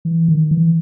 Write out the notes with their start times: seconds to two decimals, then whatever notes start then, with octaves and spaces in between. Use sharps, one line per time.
0.05 E3
0.28 D#3
0.51 E3